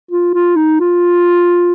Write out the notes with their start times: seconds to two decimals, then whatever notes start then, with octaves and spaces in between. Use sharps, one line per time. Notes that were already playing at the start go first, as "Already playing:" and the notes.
0.11 F4
0.34 F4
0.56 D#4
0.80 F4